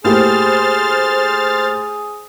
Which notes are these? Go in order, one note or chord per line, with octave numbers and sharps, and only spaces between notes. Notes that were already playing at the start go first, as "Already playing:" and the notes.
A2 A#3 G4 G#4 C5 F6 A6